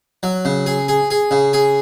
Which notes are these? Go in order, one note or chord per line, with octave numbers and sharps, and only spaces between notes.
F#3
C#3
G#4
G#4
G#4
C#3
G#4